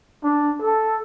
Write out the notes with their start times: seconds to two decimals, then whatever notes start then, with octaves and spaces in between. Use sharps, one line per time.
0.24 D4
0.62 A4